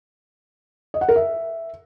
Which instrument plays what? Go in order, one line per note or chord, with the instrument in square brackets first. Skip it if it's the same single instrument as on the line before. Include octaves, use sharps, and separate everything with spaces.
[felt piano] D#5
F#5
A#4
E5